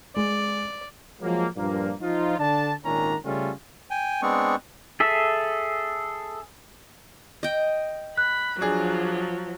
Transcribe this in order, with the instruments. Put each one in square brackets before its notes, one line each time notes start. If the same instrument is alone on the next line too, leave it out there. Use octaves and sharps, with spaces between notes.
[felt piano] G#3 [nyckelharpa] D5
[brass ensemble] F3 F#3 G#3 A#3
G2 A#2 F3 A#3
F3 D#4 F4
D3 D4 A5
G#1 A#2 D#3 C#4 D4 A#5
C#3 G3 A3 C#4 F4 A4
[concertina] G5 G#5
G#3 B3 C4 D4 C#6
[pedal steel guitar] G#4 A4 E5
[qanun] D#5 G5
[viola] B5 [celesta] F#6
[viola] F3 F#3 [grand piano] D4 G#4